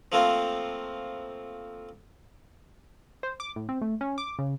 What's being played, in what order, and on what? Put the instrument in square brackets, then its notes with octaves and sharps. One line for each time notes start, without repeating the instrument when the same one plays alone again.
[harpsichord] F3 A3 A#3 C4 F4
[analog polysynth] C5
D6
A2
C4
A3
C#4
D6
C#3